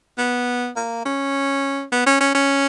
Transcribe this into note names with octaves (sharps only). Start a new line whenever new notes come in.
B3
A#3
C#4
B3
C#4
C#4
C#4